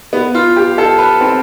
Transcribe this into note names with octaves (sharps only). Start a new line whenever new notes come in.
B3
F4
G4
A4
B4
C4